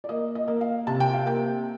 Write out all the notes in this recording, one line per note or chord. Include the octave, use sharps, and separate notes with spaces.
D5
A#3 D#5
D#5
A#3
F5
C3 A5
G5
F5
A#3 G5